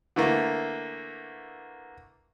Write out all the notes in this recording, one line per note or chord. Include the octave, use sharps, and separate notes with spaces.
D3 E3 A3 A#3